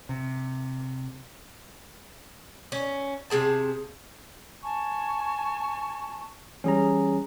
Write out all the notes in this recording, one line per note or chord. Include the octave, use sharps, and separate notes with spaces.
C3
C#4
C3 D4 G#4 A5
G#5 A5 C#6
E3 G3 C#4 G#4 A#5